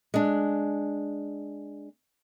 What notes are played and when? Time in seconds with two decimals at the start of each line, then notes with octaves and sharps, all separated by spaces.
0.14 G#3 D4